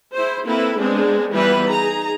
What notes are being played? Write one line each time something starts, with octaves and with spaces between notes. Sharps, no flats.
E4 G#4 C5
A#3 C4 E4 A4 B4
G#3 B3 C4 D4 G#4
E3 G3 B3 E4 F4 B4
D#4 G#4 A#5